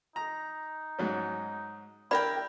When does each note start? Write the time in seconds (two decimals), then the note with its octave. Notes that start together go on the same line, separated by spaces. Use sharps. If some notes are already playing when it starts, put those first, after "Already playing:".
0.16 D#4 A#5
0.99 G#2 F#3 C#4
2.11 D4 E4 G4 A#4 D5 G5 B5